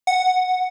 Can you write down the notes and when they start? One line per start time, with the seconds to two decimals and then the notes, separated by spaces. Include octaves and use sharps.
0.07 F#5